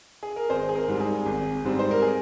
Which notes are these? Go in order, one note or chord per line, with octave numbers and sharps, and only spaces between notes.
G#4
A#4
G#1 G#4 C5
G#4
A#4
G#2 G3 C4
G#4
G#1
G#2 G3 C4
C5
A#4
G#4